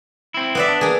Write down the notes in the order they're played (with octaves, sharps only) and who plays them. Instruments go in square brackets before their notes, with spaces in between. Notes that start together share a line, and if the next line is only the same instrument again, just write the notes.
[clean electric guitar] C4 E4
[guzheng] B3 D5 E5
[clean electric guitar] D4
[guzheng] A#3 G#4